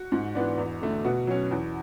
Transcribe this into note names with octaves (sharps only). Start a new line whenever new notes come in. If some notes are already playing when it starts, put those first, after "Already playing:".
Already playing: F#4
G#2
E3 B3 D4
E2
D3 A3
B2 F#4
F#3 C#4
E2